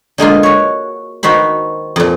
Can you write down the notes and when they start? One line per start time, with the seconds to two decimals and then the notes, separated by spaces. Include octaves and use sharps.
0.18 D3 G#3 A#3 F4
0.43 F#4 C#5
1.23 D#3 F#4 C5 B5
1.96 F2 A#2